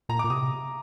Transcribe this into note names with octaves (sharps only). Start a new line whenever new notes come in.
A#2 A#5
A#2 D6
C3 D#6